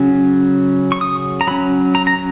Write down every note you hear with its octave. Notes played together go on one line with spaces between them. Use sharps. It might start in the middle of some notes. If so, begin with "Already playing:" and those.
Already playing: C#3 F#3 C#4
C#6
D#6
A#5
F#3 C#4 B5
A#5
A#5